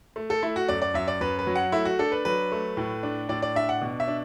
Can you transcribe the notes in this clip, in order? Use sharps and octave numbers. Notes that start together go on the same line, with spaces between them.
A3
A4
A3 E4
F#4
F#2 D5
D5
F#2 E5
D5
F#2 B4
B4
F#3
F#5
A3 E4
F#4
D4 A4
B4
F#3 B4
A3
A2
D4
A2 D5
D5
D4 E5
F#5
B2
E5
D4